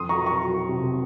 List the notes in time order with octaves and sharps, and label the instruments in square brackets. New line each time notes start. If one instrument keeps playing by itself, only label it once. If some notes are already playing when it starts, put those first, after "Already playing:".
Already playing: [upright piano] F2 C6 D#6
A#5 C#6
F#3
A#5 C#6
F#3
C3